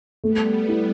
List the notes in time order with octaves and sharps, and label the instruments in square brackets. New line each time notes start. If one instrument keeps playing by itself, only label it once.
[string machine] G3 B3 [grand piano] A3
[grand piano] E4